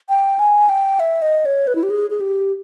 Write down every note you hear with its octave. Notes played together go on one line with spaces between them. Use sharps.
G5
G#5
G5
E5
D#5
C#5
B4
E4
G4
G#4
G#4
G4